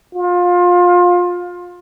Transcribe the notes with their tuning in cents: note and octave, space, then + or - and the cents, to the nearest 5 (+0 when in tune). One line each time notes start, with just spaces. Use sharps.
F4 +25